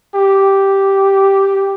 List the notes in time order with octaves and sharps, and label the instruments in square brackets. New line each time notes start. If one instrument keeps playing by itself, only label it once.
[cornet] G4